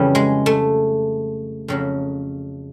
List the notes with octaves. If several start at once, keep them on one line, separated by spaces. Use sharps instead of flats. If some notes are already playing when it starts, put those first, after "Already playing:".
Already playing: F2 C#3 E3 G3
G#3
A3
F2 C#3 F#3